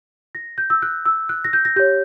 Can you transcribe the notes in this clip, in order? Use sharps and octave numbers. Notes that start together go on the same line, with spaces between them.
A#6
G6
E6
F#6
E6
F#6
A#6
G6
A#6
G4 C#5 G6